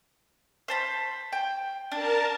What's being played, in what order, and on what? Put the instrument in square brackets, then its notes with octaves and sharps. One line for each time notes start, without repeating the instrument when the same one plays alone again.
[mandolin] C5 A5 B5
G5
[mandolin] D4 [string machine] A#4 A5